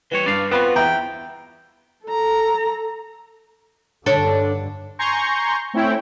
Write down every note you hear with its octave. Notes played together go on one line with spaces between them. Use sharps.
E3 G3 B4 C#5
G2 D5 F5
B3 C4 F4 F#4 B5 F#6
E2 E4 G5 A#5
A4 A#5
G2 D3 D4 A4 C#5
G#5 A#5 C6 C#6 G6
A3 C4 C#4 E4 C#5 G5